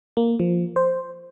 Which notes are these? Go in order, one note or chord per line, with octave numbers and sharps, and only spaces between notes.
A#3
F3
C5